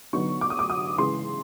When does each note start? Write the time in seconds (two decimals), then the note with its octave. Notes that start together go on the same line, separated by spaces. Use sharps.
0.13 D3 F#3 B3 D#4 C#6
0.41 D6
0.50 D#6
0.59 D6
0.70 D#6
0.97 C#3 E3 G#3 C6